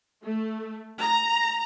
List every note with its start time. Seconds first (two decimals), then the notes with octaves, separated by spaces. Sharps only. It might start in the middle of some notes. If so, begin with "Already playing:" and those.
0.23 A3
1.01 A#5